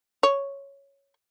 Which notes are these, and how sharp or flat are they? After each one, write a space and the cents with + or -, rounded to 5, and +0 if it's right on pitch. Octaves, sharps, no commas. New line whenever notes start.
C#5 +0